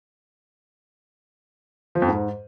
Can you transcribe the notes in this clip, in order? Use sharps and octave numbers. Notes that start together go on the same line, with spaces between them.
F3
F2
G#2